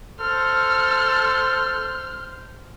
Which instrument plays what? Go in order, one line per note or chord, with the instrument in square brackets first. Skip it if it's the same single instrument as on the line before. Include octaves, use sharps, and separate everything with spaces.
[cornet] A4 [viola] C5 [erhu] F6